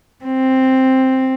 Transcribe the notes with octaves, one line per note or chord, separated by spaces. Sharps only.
C4